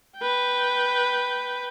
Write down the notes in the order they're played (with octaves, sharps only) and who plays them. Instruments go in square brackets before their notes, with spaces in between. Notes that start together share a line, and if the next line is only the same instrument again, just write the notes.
[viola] B4 G5